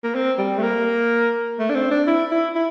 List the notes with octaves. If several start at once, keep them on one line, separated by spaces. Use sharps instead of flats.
A#3
C4
G3
A3
A#3
A3
D4
C4
D4
E4
E4
E4